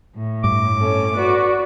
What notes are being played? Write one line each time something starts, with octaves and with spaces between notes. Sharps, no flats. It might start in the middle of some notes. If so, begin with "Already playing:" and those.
A2
G2 D6
C#4 A4
F#4 B4 D5